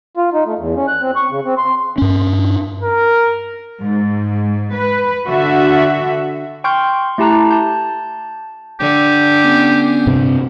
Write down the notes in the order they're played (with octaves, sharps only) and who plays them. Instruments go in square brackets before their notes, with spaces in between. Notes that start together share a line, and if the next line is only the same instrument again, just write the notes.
[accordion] F4
D#4
A3
E2
C#4
F#6
C4
C#6
C#3
C4
C6
[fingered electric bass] G2 C#4
[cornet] A#4
[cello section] G#2
B4
D3 F#4 E5
[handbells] G5 C6 C#6 F6 G6
A3 E4 G4 A5 A#5 F#6
A5 G6
[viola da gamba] D3 [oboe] G4
[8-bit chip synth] B3 C#4
[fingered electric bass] G2 C3 C4